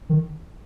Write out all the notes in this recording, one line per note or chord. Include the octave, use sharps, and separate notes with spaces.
D#3